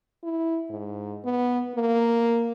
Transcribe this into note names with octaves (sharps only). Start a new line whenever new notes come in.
E4
G#2
B3
A#3